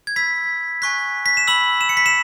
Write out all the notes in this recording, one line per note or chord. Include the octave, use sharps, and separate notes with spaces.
G#6
B5 E6 B6
G#5 C#6 F#6 B6
B6
E7
B5 E6 F#7
E7
C#7
B6
E7